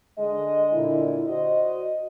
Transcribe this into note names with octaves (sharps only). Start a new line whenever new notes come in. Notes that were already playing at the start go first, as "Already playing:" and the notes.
D3 G#3 G#4 D#5
A#2 D3 E4
F#4 C5 D5 D#5